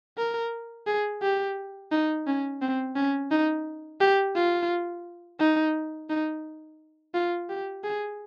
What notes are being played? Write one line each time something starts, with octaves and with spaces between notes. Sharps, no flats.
A#4
G#4
G4
D#4
C#4
C4
C#4
D#4
G4
F4
D#4
D#4
F4
G4
G#4